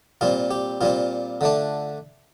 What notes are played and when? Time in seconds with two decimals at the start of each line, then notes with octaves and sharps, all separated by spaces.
0.21 A#2 G3 C4 F4
0.51 G4
0.81 A#2 G3 C4 F4
1.41 D3 A3 D4